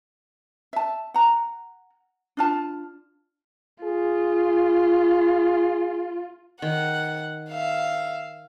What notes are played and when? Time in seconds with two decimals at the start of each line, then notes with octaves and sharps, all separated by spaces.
0.73 E5 A5
1.14 F#5 A#5
2.37 D4 F4 A5
3.84 F4 G#4
6.62 D#3 F#5
7.50 E5 F5